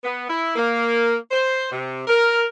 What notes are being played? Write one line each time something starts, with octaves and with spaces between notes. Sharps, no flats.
B3
E4
A#3
C5
C3
A#4